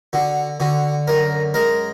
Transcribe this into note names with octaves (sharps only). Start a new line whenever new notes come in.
D3 F#4
D3 F#4
F#2 A#4
G#3 A#4